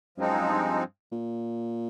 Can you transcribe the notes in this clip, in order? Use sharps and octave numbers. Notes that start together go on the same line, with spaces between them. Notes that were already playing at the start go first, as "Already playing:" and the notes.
F#2 F3 G#3 C4 D#4
F#2
G2
A#2